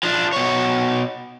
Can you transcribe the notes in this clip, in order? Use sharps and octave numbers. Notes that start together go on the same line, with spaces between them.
F3 D4
B2 C#5